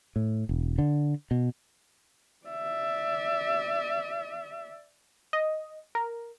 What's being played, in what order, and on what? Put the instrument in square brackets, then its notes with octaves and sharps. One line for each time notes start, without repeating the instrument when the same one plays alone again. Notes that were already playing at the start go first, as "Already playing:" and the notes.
[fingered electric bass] A2
E1
D3
B2
[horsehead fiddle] D5 E5
[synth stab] D#5
A#4